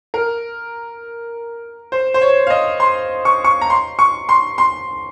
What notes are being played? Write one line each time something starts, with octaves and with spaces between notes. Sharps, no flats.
A#4
C5
C5
C#5
F5
D#5
C6
C#6
C#6
A#5
C6
C#6
C6
C6